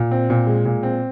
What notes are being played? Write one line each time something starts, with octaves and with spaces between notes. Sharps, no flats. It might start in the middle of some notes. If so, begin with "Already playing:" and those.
Already playing: A#2
C4
A#2
G#3
A#2
C4